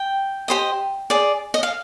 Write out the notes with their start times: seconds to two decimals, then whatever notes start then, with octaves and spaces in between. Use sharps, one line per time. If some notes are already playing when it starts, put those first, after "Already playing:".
Already playing: G5
0.48 G4 C5 D#5
1.10 G#4 D5
1.54 D#5
1.63 F5